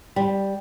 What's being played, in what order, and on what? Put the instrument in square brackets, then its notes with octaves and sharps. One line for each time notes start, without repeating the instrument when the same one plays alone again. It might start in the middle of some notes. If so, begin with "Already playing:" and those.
[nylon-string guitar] G3